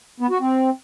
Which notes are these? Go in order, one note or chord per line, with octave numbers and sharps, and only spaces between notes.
B3
F#4
C4